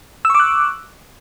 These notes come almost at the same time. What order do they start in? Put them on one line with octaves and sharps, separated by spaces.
E6 C#6 D6 F#6